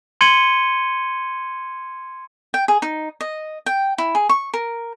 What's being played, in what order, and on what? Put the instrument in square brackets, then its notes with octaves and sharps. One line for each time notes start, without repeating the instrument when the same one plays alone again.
[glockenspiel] C6 G#6 C#7 D#7 G7
[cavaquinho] G5
G#4
D#4
D#5
G5
E4
G#4
C#6
A#4